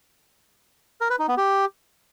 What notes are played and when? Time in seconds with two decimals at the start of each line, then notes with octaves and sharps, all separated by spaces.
1.01 A#4
1.10 B4
1.19 D#4
1.28 B3
1.37 G4